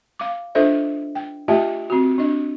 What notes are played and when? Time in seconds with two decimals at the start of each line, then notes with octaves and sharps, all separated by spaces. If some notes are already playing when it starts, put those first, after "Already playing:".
0.19 F5 D6
0.55 D4 F4 A4 C5 D#5 E5
1.15 G5
1.48 A3 F4 G4 D#5 E5 A5
1.90 C4 F#4
2.18 D4 D#5